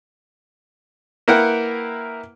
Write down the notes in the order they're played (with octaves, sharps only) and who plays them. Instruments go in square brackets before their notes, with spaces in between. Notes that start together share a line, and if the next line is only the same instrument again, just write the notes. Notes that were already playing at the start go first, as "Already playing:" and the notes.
[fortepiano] A#3 E4 A#4 B4 F#5 G5